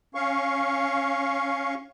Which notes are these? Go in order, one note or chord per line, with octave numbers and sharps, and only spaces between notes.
C#4 F5 C#6